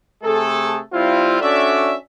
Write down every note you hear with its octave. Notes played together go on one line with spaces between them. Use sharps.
C3 A3 G#4 A4
G3 C4 E4 F4
C#4 D4 F#4 A4 D5 E5